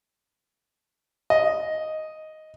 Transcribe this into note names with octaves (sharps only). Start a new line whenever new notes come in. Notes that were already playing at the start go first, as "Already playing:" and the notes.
D#5